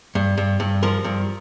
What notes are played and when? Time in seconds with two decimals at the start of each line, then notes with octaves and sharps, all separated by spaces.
0.15 G2
0.38 G2
0.60 G2
0.83 F3 A#4
1.04 G2